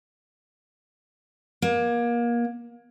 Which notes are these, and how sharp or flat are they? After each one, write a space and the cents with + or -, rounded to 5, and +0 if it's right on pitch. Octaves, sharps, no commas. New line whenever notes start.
A#3 +30